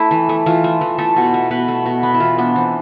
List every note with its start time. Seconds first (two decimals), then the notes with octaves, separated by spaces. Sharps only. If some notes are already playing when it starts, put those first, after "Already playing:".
Already playing: A3 E4
0.11 E3
0.29 A3
0.46 E3 F4
0.64 A3
0.81 E3
0.98 A3 A4
1.16 B2
1.34 A3
1.51 B2 B4
1.68 A3
1.86 B2
2.03 B3 B4
2.14 E4
2.20 E3 F4
2.38 B3 D4
2.56 E3 C4